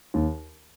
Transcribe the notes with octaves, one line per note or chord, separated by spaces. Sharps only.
D#2